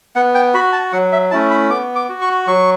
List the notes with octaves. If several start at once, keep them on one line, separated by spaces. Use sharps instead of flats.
B3 F#5
G5
F#4 B5
A5
F#3 F#5
E5
A3 C#4 E4 A5
B5
B3 D6
D6
F#4
C#6
F#3 C#6